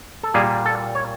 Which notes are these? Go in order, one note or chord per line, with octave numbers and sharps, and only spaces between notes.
A4
A#2 G3 A#3 G#4
A4
C#5